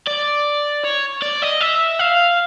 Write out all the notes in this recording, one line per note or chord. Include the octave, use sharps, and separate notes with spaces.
D5
C#5
D5
D#5
E5
F5